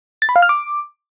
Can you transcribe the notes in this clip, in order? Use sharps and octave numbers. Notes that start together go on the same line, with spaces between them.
A6
B5
F5
F6
D6